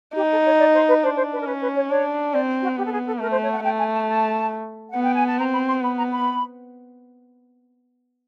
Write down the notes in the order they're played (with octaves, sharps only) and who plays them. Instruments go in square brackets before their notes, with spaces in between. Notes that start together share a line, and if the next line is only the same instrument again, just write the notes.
[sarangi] D#4 [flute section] G4
[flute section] A4
C#5
D5
C5
B4
[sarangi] D4 [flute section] C5
[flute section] C5
B4
A#4
[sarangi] C#4 [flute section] B4
[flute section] B4
C#5
[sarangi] D4 [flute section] C#5
[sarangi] C4 [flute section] D5
[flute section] F#4
[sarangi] B3 [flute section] G4
[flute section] A4
G#4
A4
[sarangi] A3 [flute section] A#4
[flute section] C5
C#5
F#5
[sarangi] A3 [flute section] G5
[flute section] G#5
A5
A5
F#5
[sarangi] B3
[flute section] G5
G#5
A5
[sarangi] C4 [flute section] A#5
[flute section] B5
C6
[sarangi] B3 [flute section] B5
[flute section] A#5
B5